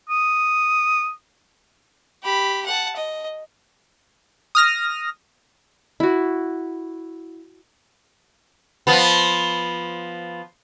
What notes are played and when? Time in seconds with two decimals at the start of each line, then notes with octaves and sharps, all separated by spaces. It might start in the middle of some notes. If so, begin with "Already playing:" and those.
0.09 D#6
2.23 G4 B5
2.66 F#5 A5
2.96 D#5
4.55 D#6 F6 A#6
6.00 E4 F#4
8.87 F3 B3